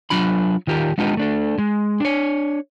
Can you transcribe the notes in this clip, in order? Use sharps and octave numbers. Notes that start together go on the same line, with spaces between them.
F#3 D4 F4 B5
D#3 F4 G4 A#4
G#3 B3 D4 D#4 F4 G4
A3 D4 A4
G#3
D4 C#5